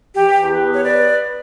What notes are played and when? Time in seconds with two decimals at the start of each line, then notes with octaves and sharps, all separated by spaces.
0.16 E3 G4
0.40 E2
0.51 G4 B4
0.63 B3
0.75 C#5
0.85 B4 D5